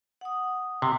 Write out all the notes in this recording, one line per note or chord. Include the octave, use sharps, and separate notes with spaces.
F#5 D#6
C3